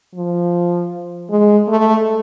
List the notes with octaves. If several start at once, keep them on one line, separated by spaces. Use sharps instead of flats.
F3
G#3
A3